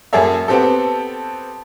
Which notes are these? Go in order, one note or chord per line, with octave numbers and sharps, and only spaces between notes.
F#2 A#3 G#4 A4 C#5 E5
B3 C4 G4 A4